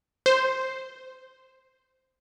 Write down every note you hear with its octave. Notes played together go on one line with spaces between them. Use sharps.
C5